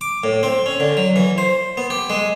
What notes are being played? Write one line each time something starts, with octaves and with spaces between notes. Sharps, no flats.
D6
A2
C4
C#4
D3
F#3
E3
C5
B3
G4
G#3